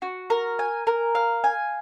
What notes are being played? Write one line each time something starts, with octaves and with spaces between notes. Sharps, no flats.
F#4
A#4
G#5
A#4
F5
G#5